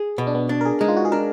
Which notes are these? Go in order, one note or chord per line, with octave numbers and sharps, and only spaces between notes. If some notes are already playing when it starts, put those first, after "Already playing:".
Already playing: G#4
B2 B3
D4
B3
D4
A#4
G#4
G#3 D#4
F4
F#4
G#4
D4 A#4